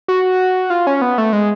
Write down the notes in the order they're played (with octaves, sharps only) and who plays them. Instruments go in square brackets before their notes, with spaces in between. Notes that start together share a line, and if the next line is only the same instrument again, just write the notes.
[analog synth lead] F#4
F4
C#4
B3
A3
G#3